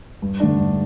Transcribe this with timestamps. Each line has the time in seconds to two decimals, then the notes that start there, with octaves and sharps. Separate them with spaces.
0.22 G2
0.40 D3 A3 D4
0.58 G2